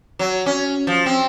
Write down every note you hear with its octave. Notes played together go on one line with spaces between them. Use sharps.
F#3
C#4
F3
C4